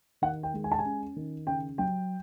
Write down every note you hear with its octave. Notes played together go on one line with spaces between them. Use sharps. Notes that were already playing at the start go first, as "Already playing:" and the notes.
D#3 F#5
G5
G#3
G#5
A5
G#5
C#4
D#3
C#3 G5
F#3 G5